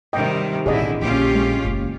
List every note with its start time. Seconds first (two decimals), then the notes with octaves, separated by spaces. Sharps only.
0.13 C3 D#3 G3 D#5 G5
0.66 A1 B2 D3 C4 E4 G#4 D5 D#5
1.01 A#1 A#2 C#4 F4 G4
1.35 G#3
1.65 F#1